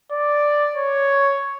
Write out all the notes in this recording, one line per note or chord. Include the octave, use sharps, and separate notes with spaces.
D5
C#5